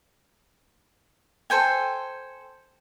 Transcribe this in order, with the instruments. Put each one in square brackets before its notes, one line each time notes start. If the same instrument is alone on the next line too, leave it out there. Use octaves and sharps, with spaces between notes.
[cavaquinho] A4 C5 G5 G#5